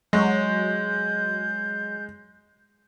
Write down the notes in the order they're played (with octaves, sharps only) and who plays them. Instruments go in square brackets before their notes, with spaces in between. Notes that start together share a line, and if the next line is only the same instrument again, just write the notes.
[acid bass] F#3 [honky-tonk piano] G#3 [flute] G6